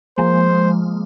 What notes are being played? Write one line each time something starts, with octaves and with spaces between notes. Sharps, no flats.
F3 G#3 A#3 C5